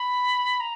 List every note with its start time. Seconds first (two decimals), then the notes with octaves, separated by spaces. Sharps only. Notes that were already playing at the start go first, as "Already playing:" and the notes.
Already playing: B5
0.60 A#5